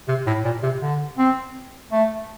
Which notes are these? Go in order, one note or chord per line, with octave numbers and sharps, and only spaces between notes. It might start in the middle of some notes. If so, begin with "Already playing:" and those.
C3
A2
A#2
C3
D3
C4
A3